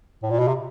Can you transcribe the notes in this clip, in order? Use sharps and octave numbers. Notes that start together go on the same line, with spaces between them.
A2
A#2
B2
C3